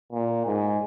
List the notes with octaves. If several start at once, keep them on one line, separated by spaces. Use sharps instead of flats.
A#2
G#2